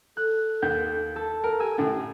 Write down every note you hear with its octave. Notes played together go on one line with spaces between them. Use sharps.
A4 F#6
D#2 G6
A4
A#4
G4 G#5 E6
F#2 A2 D3